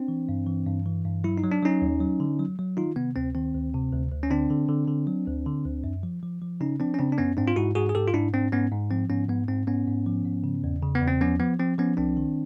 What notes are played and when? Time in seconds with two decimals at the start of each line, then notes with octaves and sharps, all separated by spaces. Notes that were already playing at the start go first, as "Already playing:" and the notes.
Already playing: C4 D4
0.08 E3
0.29 G2
0.47 E3
0.67 G2
0.86 E3
1.05 G2
1.24 F#3 E4
1.38 D#4
1.43 F#3
1.51 D4
1.63 F#3 C#4 D#4
1.82 D#2
2.00 F#3
2.20 D3
2.39 F#3
2.59 F#3
2.77 D#3 D#4 F4
2.96 C3 B3
3.16 D2 C4
3.35 D#3 C4
3.54 D2
3.74 C3
3.93 D2
4.12 D2
4.23 C#4
4.31 D3 C4 D4
4.50 D3
4.69 D3
4.88 D3
5.07 F#3
5.27 D2
5.46 D3
5.65 D2
5.84 F#2
6.03 F3
6.23 F3
6.42 F3
6.60 C#3 C#4 D#4
6.80 F3 C4 D4
6.94 C#4
6.99 C#3 C4 D4
7.12 D4
7.18 F#2 B3 C#4
7.37 G#2 C4 D4
7.48 F4
7.56 G#2 E4 F#4
7.75 G#2 F#4 G#4
7.89 G#4
7.95 G#2 G4 A4
8.08 F4
8.14 G#2 D4 E4
8.33 G#2 C4 D4
8.52 G#2 B3 C#4
8.71 G#2
8.90 F3 C4
9.10 G#2 B3 C#4
9.29 G#2 B3
9.48 G#2 C4
9.67 G#2 B3 C#4
9.87 G#2
10.07 F3
10.25 G#2
10.44 C#3
10.64 E2
10.82 C#3
10.95 B3
11.02 E2
11.08 C4
11.21 F3 B3 C#4
11.40 F3 B3
11.59 F3 C4
11.78 F3 B3 C#4
11.97 C2 C4 D4
12.17 D#3